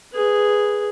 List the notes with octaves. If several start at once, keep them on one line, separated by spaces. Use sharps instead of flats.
G#4 B4